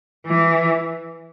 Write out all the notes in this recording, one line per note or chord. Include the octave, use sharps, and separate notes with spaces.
E3